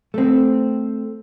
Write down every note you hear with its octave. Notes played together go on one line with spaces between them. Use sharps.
A3 C4